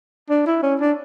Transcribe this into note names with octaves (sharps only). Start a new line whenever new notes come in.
D4
E4
C#4
D4